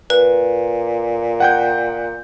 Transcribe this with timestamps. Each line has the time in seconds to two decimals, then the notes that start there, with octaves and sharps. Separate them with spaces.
0.10 A#2 B4
1.40 F#5 G5 G6